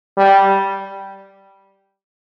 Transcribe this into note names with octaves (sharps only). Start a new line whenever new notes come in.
G3